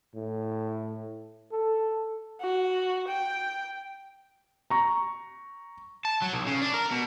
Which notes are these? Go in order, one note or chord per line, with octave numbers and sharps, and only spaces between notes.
A2
A4
F#4
G5
A#5 C#6
A5
F#3
B1
C#3
D4
A#4
B2